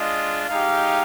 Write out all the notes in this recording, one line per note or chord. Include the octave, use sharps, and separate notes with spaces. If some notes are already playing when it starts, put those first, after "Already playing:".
Already playing: G#3 D4 F4 D#5
G#3 D#4 G4 F5